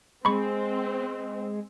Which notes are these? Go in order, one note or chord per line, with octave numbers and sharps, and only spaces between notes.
G#3 C4 B5 C#6